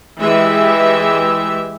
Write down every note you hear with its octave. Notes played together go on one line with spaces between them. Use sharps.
E3 G#3 G4 E5